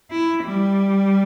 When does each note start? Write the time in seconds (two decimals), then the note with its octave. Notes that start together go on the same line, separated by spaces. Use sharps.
0.11 E4
0.43 G3